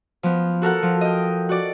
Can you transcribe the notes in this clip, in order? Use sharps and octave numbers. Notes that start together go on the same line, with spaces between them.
F3 B3
F#4 A4 A#4 F#5
F3
D#5 G5
F#4 D5